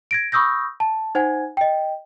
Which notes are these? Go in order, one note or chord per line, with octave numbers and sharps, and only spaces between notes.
G#6 A#6 D7
B5 C#6 D#6 E6 G6 A#6
A5
D#4 C5 F#5 G#5 G#6
D#5 G5